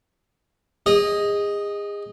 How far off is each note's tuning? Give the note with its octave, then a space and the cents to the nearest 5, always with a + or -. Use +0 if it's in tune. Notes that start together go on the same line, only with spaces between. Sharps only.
G#4 -30 D#5 +0